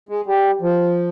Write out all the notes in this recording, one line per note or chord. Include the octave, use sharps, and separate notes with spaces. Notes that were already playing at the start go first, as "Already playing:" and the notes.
G#3
G3
F3